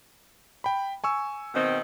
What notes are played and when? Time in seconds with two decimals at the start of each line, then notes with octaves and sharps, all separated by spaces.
0.64 G5 B5
1.04 G#5 C#6 E6
1.54 B2 D#3 C4